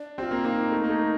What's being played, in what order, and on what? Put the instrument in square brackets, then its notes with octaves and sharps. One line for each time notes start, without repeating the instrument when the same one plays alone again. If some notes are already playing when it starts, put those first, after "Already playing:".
Already playing: [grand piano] D4
[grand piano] C4 [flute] G4
[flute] F4
[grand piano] A#3
[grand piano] A#3 [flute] D#4
[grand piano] A3
A#3
A3